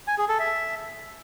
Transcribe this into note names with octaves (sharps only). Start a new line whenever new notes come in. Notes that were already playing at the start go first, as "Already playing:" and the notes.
G#5
G#4
A4
E5